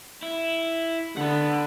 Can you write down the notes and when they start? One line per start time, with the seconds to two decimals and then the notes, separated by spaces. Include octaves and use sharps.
0.23 E4
1.17 D3 F#5 B5